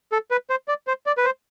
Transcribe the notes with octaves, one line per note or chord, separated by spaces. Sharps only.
A4
B4
C5
D5
C5
D5
B4
C5